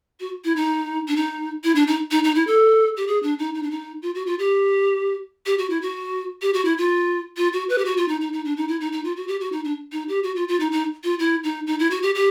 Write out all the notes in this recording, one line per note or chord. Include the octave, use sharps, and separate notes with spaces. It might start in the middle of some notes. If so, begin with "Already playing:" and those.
F#4
E4
D#4
D4
D#4
E4
D4
D#4
D#4
D#4
E4
A4
G4
G#4
D4
D#4
D#4
D4
D#4
F4
F#4
F4
G4
G4
F#4
E4
F#4
G4
F#4
E4
F4
F4
F#4
B4
G4
F#4
F4
D#4
D#4
D#4
D4
D#4
E4
D#4
D#4
F4
F#4
G4
F#4
D#4
D4
D#4
G4
F#4
F4
F4
D#4
D#4
F4
E4
D#4
D#4
E4
F#4
G4
G4